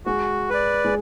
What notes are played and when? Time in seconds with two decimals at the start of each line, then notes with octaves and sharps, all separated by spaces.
0.06 G#3 F#4
0.50 B4 D5
0.85 G#3